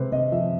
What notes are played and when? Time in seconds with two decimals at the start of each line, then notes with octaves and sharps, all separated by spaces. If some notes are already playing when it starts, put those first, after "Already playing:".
Already playing: C3 G#3 B4 C5
0.12 C3 D#5
0.32 F3 E5